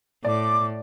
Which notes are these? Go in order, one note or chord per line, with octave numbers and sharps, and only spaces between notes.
A2 D5 D6